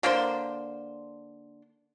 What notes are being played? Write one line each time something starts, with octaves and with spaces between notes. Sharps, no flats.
D3 A#3 D4 C5